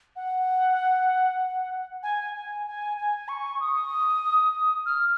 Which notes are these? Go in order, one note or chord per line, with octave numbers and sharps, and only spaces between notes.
F#5
G#5
G#5
G#5
G#5
C#6
D#6
F6